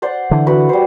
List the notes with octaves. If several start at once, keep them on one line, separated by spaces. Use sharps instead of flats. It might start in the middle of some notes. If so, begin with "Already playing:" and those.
C5 D5 F#5
D3 E3
F#4 B4
G3 C5